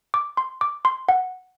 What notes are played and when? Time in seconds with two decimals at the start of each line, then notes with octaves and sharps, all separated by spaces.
0.14 D6
0.37 C6
0.61 D6
0.85 C6
1.09 F#5